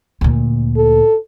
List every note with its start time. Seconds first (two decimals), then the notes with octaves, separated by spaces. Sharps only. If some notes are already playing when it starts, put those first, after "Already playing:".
0.21 D2 A#2
0.77 A4